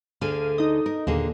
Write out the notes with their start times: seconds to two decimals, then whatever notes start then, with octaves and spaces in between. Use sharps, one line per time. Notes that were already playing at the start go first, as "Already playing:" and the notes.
0.21 D2 D3 G#4 F5 D#7
0.58 D#4 D#5
0.86 A#4
1.07 D#2 A#2 D3 A#3 G#4